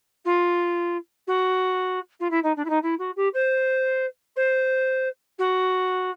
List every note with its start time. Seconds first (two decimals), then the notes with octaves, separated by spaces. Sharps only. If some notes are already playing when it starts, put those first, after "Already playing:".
0.25 F4
1.27 F#4
2.20 F4
2.30 E4
2.43 D#4
2.56 D4
2.64 E4
2.69 D#4
2.82 E4
2.99 F#4
3.16 G4
3.33 C5
4.36 C5
5.38 F#4